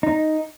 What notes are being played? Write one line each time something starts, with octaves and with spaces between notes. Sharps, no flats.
D#4